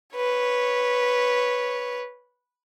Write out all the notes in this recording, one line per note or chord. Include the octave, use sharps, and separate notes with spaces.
B4 C#5